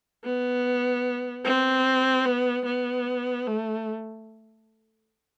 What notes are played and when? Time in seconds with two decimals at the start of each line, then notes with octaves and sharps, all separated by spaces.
0.24 B3
1.45 C4
2.25 B3
2.66 B3
3.47 A3